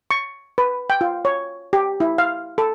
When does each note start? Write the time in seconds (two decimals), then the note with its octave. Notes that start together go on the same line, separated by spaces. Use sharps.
0.11 C#6
0.58 B4
0.90 G5
1.01 F4
1.25 C#5
1.73 G4
2.00 E4
2.18 F5
2.58 A4